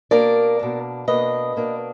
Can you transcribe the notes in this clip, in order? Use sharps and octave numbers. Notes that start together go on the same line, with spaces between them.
B2 A#3 D4 A#4 D5
B2 A#3 D4
B2 A#3 D4 B4 D#5
B2 A#3 D4